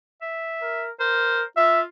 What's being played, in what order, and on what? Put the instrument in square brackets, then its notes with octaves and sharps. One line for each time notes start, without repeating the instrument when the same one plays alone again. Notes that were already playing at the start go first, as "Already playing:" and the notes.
[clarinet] E5
[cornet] A#4
[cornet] A#4 [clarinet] C5
[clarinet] F4 [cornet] E5